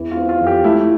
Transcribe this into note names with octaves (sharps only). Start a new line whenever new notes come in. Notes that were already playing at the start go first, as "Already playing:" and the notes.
Already playing: E2 E3
F4
C4
F4
F2
G4
A3 E4